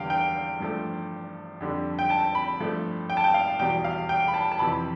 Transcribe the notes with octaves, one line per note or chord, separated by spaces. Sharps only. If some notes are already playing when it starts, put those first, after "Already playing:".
Already playing: E2 D3 G3 F5 G5
G5
G2 F3 A3
F2 D3 G3
G5
A5
B5
G2 F3 A3
G5
A5
G5
F5
E2 B2 G3 G5
F5
G5
B5
A5
A5
F2 C3 E3 B5